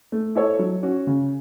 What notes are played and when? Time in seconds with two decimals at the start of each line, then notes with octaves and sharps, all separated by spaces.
0.12 A3
0.35 E4 A4 C#5
0.59 F#3
0.83 C#4 F#4
1.07 C#3